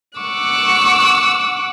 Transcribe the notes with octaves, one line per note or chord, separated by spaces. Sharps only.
F#5 C#6 D6 E6 F#6